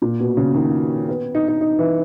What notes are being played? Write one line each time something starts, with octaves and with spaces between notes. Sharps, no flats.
A#2
B2
C#3
D#3
B3
D#4
D#4
D#4
E3